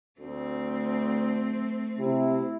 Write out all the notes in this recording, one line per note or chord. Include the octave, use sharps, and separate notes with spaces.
D2 A3 C4
C3 E4